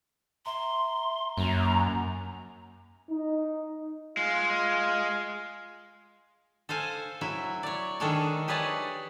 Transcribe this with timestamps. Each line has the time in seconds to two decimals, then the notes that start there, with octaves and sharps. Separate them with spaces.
0.46 E5 A#5 C6
1.38 F#2 A#3 A#5
3.11 D#4
4.17 G#3 F4
6.69 A4 C5 F5 G#5
7.21 F#3 E4 E5
7.63 C#5 D5
8.00 D#3 G#3 D4 A4 C#5 D5
8.48 G4 G#4 B4 C#5 D5 A5